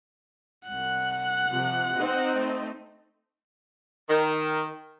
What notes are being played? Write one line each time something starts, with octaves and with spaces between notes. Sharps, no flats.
C2 F#5 F#6
C3 F3
C4 D#4 D#5
A3
D#3